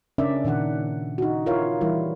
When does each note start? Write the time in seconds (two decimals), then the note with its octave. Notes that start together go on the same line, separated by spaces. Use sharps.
0.18 C#3 C#4 D4 A#4 D5 E5
0.44 A#2 D#3 D4 F#5
1.18 D#4 F#4
1.46 E4 F4 A#4 C#5 F5
1.81 E3 G3 E4 A#4